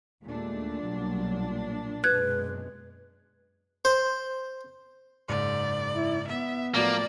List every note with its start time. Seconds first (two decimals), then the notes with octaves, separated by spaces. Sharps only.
0.23 D#2 A#2 G#3 A3 D4
0.86 B1 F#3 G3
2.04 F#2 B2 G#3 B4 F#6 G#6
3.85 C5
5.29 F#1 G#2 D5
5.95 E4
6.28 B3 E5
6.74 A2 F3 F#3 A#3 D5